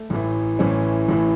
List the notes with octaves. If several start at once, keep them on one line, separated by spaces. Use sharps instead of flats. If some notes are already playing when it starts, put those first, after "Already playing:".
Already playing: A3
A1 A2 E3
A1 A2 E3 C#4
A1 A2 E3